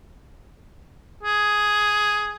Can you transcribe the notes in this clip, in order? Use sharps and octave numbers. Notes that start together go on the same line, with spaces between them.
G#4